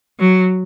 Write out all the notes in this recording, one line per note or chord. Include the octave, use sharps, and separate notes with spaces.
F#3